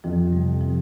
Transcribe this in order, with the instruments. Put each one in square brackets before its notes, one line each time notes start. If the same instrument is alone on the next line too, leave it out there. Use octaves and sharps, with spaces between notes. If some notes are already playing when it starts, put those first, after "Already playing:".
[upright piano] F2 [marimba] F3
[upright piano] C3 [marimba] G3
[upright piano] C3 [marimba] F3